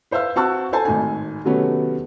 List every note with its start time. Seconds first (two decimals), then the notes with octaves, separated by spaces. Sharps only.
0.11 B4 C5 E5 F5 E6
0.36 C4 F#4 A5 C#6 E6 F#6
0.73 A4 C5 G#5 A5
0.85 G#1 A2 D#4 G#5
1.44 C3 D#3 F#3 A3 B3 C#4